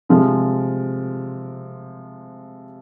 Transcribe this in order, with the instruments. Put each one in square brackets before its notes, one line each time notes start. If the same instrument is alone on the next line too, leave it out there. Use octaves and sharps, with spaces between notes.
[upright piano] C3 F3 G#3